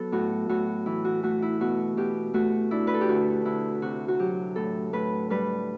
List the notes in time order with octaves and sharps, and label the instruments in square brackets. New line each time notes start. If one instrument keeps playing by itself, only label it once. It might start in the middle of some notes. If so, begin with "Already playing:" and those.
Already playing: [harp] F#3 B3 A4
A2 F#4
A2 F#4
E3 E4
F#4
A3 F#4
E4
B2 F#4
B2 G4
A3 F#4
D4 E4
B4
A4
G4
D2 F#4
D2 E4
C3 F#4
F#4
F#3 G4
A2 A4
A2 B4
G3 B4